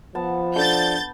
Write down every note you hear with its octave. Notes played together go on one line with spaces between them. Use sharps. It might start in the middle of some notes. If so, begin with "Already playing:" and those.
F3 B3 F#5 A5
D4 A4 G6 A6